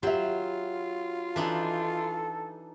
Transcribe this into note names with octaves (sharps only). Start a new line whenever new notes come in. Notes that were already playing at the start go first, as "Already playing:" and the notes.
F#3 F4 G4 E5
E3 D4 D#4 A4